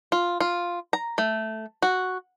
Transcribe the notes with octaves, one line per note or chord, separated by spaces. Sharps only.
F4
F4
A#5
A3
F#4